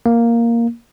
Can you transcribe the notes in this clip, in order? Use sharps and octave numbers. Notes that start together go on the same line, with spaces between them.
A#3